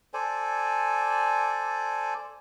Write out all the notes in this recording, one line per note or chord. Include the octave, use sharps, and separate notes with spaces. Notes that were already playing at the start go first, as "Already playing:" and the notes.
A4 C5 D5 G#5